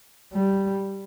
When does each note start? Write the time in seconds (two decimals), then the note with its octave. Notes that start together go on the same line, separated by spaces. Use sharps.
0.33 G3